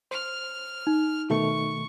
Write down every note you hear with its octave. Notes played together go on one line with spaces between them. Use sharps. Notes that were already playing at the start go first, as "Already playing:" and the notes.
C5 F6
D#4
B2 D#3 A3 C#6